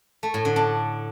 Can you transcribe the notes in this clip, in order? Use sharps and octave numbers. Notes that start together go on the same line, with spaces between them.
A3
A2
D3
D4